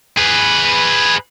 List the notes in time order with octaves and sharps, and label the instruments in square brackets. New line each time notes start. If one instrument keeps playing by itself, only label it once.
[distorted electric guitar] G#4 B4